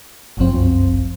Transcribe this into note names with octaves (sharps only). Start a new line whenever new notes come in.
G1 C2 F#2 F3 C4